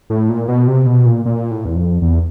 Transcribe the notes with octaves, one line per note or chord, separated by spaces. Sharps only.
A2
A#2
B2
C3
B2
A#2
A#2
A2
E2
F2
E2